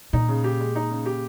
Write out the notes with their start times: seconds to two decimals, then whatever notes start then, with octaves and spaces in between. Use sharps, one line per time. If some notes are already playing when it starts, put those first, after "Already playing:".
0.13 A#2 D#4
0.28 C#3
0.44 G4
0.60 G#3
0.75 D#4
0.91 C#3
1.06 G4